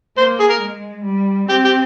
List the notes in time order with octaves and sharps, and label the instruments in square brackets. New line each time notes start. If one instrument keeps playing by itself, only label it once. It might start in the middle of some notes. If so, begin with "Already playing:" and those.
[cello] A#3 [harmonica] C5
[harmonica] G#4
A#4
[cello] G#3
G3
[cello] C4 [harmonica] G4
[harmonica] G4